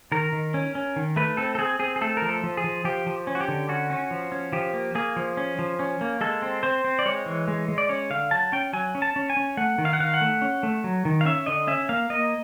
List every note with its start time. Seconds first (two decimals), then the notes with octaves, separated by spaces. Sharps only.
0.12 D#3 A#4
0.33 D#3
0.54 C#4
0.75 C#4
0.96 D#3
1.16 A3 B4
1.37 C4 A4
1.55 A4
1.59 C4 G#4
1.79 C4 G#4
1.96 G#4
2.01 A3 A4
2.17 A#4
2.22 F3
2.29 A4
2.44 F3
2.57 G#4
2.64 F3
2.84 F3 G4
3.07 F3
3.27 C#4
3.35 F#4
3.41 G4
3.48 D3
3.69 C#4 F#4
3.90 C#4
4.11 F3
4.32 C#4
4.53 F3 G4
4.74 A#3
4.95 A#3 G#4
5.16 F3
5.37 C#4
5.59 F3
5.79 C#4
6.01 A#3
6.21 G#3 A4
6.42 C4
6.63 C4 C5
6.84 C4
6.99 D5
7.06 G#3 C#5
7.26 E3
7.48 G#3
7.68 G#3
7.78 D5
7.89 C#4 C#5
8.10 D3 F5
8.31 F#3 A5
8.52 C#4 G5
8.73 F#3 G#5
8.95 C#4
9.02 A5
9.16 C#4
9.30 G#5
9.37 C#4
9.57 A3 F#5
9.78 D#3
9.85 F5
9.93 F#5
10.00 D#3 F5
10.14 F#5
10.21 A3
10.42 C#4
10.63 A3
10.84 F#3
11.05 D#3
11.21 F5
11.25 C#4 E5
11.46 D3 D#5
11.67 C#4 E5
11.89 A#3 F5
12.10 A#3 D#5